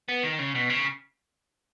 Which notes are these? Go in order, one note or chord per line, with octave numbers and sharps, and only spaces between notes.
B3
D#3
C#3
B2
C#3